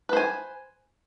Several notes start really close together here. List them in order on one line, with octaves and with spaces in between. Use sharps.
B4 C5 G#5